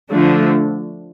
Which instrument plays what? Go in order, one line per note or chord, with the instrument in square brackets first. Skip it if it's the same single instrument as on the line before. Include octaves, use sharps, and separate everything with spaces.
[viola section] D3 F3 A3 D4